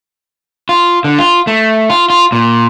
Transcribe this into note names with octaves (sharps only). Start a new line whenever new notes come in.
F4
D3
F4
A3
F4
F4
A#2